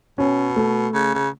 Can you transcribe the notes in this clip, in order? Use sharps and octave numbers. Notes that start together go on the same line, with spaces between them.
B2 C#4
A3
C#3
C#3